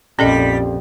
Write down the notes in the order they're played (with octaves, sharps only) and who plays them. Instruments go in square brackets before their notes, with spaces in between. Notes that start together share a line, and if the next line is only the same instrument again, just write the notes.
[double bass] A#1 F2 [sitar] G3 [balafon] C#4 A4 D#5